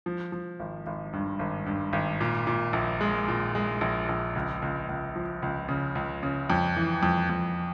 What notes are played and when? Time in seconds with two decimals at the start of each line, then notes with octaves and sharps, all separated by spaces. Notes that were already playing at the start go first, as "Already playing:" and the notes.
0.06 F3
0.32 F3
0.59 G#1
0.86 G#1
1.13 G2
1.39 G#1
1.66 G2
1.93 G#1
2.21 A#2
2.47 A#2
2.73 A#1
3.01 G#3
3.28 A#2
3.55 G#3
3.81 A#1
4.09 A#1
4.35 C#2
4.62 C#2
4.89 C#2
5.16 F3
5.42 C#2
5.68 C#3
5.95 C#2
6.23 C#3
6.50 F2
6.76 E3
7.03 F2
7.30 F2